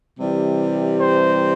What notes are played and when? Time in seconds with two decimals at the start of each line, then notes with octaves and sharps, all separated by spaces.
0.19 C3 E3 G3
1.01 C5